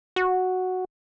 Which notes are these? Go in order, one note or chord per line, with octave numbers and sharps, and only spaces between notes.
F#4